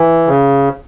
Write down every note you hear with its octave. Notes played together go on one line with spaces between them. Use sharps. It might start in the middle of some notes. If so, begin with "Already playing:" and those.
Already playing: E3
C#3